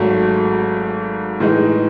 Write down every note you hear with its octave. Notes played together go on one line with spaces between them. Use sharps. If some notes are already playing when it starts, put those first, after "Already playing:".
Already playing: G#1 G#2 F#3 A3
A2 E3 G#3 D#4